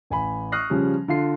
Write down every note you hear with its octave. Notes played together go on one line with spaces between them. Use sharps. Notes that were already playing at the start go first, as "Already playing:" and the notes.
A1 G#5 B5
C#6 D#6 F6 F#6 A#6 C7
C#3 F3 G3 C#4
D3 F4 C7